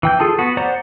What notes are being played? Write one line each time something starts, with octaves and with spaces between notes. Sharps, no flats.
E3 G5 G6
F4 G#4 A4 A5
B3 F#4
C5 D5 F#5 A#5